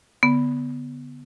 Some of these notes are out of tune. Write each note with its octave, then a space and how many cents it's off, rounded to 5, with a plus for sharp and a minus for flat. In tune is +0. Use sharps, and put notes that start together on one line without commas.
D3 -30 B3 +0